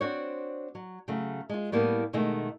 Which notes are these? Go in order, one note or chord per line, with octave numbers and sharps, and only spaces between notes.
C4 D4 F#4 C5 C#5
F#3
C#3 F#3 A3
G#3 F4
A2 G3 A#3 B3
B2 D#3 G#3 A3